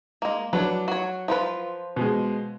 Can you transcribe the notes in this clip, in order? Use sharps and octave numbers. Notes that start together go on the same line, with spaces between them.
G#3 A#3
F#3 D4 B4
F#4 C#5
F3 F4 B4
B2 G#3